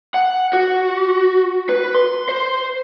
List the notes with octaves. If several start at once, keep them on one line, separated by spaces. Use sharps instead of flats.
F#5
F#4
B4
C6
C5